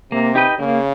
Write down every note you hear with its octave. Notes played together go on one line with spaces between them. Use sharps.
C3 A#3
D#4 G4 B4 D#5
C#3 A#3